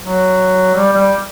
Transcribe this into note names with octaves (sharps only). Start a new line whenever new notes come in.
F#3
G3
G3